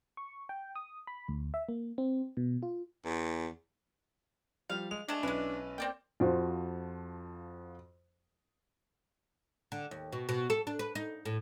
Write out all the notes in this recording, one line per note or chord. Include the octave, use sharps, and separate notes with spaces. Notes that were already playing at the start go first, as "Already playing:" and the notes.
C#6
G5
D#6
B5
D2
E5
A#3
C4
B2
F4
E2
F3 G3 F5
G#3 F7
G#3 A3 D4 A5
B1 G#3 C#4 E4 B4
A#3 C4 D5 G5
F2 F3 F#4
D3
D#2
B2
B2
A4
D4
B4
D#4
A2